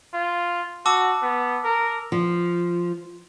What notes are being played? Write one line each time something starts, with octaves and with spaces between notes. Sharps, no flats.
F4
F#4 A5 D6 E6
B3
A#4
F3